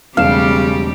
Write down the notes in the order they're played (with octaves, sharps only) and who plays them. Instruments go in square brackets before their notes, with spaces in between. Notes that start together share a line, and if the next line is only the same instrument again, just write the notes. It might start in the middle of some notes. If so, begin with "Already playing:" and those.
[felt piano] E1 A3 E7 [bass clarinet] C#3 [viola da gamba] G3 C4 G4 [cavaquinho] F5